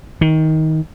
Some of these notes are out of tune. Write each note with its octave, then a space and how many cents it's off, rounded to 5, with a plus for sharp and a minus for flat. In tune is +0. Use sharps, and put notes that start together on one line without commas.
D#3 +20